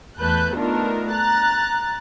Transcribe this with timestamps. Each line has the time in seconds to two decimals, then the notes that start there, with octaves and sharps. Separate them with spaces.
0.19 E2 A3 B4 A5 F#6 G6
0.54 A3 B3 D4 D#4 F4 A#4
1.10 A#5 F#6 A6